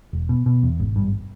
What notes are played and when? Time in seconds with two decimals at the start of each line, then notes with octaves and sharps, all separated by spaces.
0.13 E1
0.29 B2
0.46 B2
0.63 E2
0.80 G#1
0.96 G2